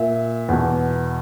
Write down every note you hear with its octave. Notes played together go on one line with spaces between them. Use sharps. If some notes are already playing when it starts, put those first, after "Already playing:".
Already playing: A#2 E5
E2 B2